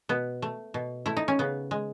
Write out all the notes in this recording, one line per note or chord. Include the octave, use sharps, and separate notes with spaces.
B2 B3
A3
B2
A3 E4
D#4
C#4
C#3 B3
G#3